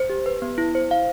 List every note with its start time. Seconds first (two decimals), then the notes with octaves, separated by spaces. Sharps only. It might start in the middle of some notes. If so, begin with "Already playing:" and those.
Already playing: C5
0.10 G4
0.26 B4
0.42 B3
0.58 E4
0.75 C5
0.91 F5